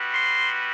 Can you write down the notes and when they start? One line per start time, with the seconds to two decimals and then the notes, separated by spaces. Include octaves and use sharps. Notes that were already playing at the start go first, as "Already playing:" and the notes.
Already playing: G3 B3 F#4
0.14 C6